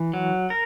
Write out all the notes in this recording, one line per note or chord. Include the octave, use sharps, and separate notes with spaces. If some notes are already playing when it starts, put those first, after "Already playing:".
Already playing: E3
F#3
A#4